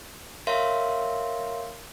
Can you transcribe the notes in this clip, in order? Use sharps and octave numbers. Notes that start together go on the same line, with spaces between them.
A#4 C#5 E5 F5 C6